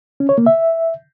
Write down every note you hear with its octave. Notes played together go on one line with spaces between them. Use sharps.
C#4
C#5
A#3
E5